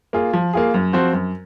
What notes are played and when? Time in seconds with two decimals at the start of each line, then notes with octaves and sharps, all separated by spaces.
0.13 A#3 F4 G#4
0.33 F3
0.53 A#3 F4 G#4
0.74 F#2
0.93 F3 C4 F#4 C5
1.13 F#2